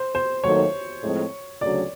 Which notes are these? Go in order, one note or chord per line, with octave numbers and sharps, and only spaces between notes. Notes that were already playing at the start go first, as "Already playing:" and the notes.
Already playing: C5
C5
D#2 D#3 F#3 A3 C#5
A2 F3 G#3 C4
D2 C#3 F#3 D5